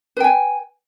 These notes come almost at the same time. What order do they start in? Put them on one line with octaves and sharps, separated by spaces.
B4 G5 G#5